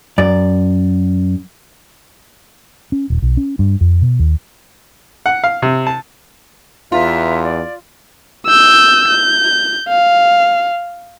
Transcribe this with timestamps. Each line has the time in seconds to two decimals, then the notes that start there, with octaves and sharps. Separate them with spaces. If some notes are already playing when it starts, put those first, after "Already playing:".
0.18 F#2 D5
2.92 C#4
3.10 D#1
3.22 B1
3.37 C#4
3.59 G2
3.81 F2
4.02 B2
4.19 D#2
5.26 F#5
5.44 F5
5.62 C3
5.87 A5
6.92 E2 F4 B4 E5 A#5
7.42 D5
8.47 E6 G6
9.08 G6
9.88 F5